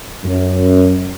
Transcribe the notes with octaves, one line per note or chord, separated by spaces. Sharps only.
F#2